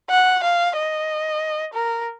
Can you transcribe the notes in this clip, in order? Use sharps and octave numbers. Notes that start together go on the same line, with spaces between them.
F#5
F5
D#5
A#4